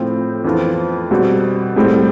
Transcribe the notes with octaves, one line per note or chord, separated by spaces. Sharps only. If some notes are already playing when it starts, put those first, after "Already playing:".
Already playing: A2 F3 C4 F4
F2 E3 B3 F4 C5
B2 G3 C4
A2 G3 C4